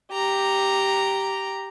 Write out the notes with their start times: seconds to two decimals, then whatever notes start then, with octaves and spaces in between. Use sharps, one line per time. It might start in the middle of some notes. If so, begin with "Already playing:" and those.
0.12 G4 A#5